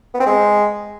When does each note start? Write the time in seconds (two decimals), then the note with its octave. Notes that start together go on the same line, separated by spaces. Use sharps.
0.14 B3
0.20 C4
0.26 G#3